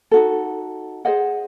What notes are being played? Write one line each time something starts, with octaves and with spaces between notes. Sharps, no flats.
D#4 F#4 A4
G#4 C5 D#5 F#5